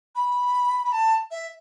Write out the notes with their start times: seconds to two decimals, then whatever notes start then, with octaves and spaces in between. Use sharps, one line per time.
0.15 B5
0.84 B5
0.92 A5
1.31 E5